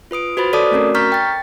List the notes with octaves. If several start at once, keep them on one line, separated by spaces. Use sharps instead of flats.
F4 B4 D#6 D7
F#4 B4 C5 B5 A6
A4 C#5 D5 A5 D6 D#6
A3 C4 C#4 F#4 A#4
A#5 C#6 F6 G6 A6 B6
G5 A6